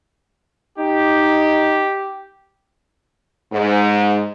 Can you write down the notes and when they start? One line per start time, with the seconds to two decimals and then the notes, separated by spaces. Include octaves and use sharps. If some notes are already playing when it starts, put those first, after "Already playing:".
0.79 D#4 G4
3.52 G#2